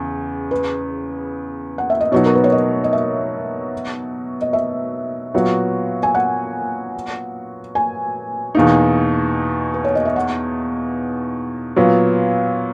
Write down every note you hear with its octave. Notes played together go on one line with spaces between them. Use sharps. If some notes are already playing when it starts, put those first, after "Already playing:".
Already playing: E2 C#3
B4
F#5
E5
D#5
B2 F#3 B3 D#4 F#4 C#5
A#4
B4
C#5
D#5
D#5
E5
D#5
E5
A#2 F#3 B3 F#4
G#5
F#5
G#5
E2 B2 A#3 D#4
B4
C#5
D#5
E5
F#5
A#2 F#3 B3